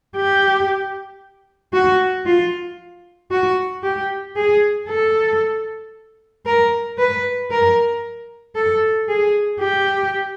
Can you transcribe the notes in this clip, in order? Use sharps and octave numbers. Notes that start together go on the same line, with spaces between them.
G4
F#4
F4
F#4
G4
G#4
A4
A#4
B4
A#4
A4
G#4
G4